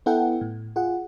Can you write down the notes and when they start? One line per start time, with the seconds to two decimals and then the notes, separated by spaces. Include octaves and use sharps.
0.06 B3 E4 A4 F#5 G5
0.41 A2
0.76 F4 G#4 F#5